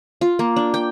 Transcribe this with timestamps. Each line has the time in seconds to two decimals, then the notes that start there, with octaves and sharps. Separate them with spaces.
0.21 F4
0.39 A#3
0.56 D4
0.74 G5